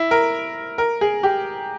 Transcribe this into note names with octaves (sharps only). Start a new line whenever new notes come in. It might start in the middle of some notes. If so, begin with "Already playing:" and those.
Already playing: E4
A#4
A#4
G#4
G4